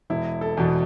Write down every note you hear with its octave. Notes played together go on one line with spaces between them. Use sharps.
E1 E4
A4
E2 B2